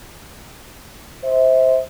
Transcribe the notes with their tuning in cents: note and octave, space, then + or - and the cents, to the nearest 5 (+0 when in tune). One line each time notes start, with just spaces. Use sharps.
C5 +0 E5 -25